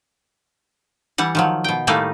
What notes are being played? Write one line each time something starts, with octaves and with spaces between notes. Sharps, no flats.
E3 G3 F#5
D#3 F3 F#3
B2 G5
A2 D#3 G3 A3 A#3 D#4